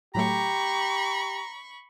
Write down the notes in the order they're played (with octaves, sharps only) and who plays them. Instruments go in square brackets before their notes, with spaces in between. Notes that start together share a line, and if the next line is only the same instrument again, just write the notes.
[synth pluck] A2 F#3 A3 [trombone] G4 [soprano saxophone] A#5 [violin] B5 C#6